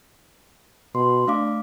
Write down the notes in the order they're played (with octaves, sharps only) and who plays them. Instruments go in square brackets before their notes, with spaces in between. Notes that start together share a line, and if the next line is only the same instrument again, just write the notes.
[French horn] B2 [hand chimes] C6
[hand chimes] A3 F5 D6 [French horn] D4